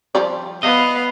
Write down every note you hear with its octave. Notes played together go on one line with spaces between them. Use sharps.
F3 G3 D5
B3 D#5 F5